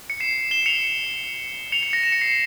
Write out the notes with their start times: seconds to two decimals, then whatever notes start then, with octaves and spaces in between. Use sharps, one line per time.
0.10 C#7
0.20 C7 E7
0.51 E7 G7
0.66 C#7 F7
1.72 C#7 F7
1.83 C#7 F7
1.93 A#6 C#7
2.03 E7
2.12 C#7
2.21 C7